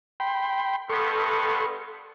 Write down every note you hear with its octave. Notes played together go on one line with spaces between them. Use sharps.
G5 B5 C6
G2 B3 A4 C6 C#6